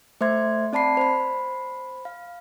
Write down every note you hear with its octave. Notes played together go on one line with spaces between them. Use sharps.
A3 C5 E5 C6 G#6
C4 D5 A5 B5 C7
C5 B5
F5